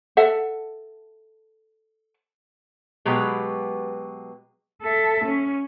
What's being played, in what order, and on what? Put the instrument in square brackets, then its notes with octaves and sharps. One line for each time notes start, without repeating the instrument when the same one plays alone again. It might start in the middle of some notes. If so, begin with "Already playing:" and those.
[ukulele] A4 E5 F#5
[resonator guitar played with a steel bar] B2 F#3 G#3 G4 B4 A#5
[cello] A4 E5
C#4